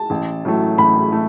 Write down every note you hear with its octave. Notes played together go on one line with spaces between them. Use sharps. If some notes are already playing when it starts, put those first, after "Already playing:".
Already playing: A5
A1
A2 F#3 A3
A1 B5
A3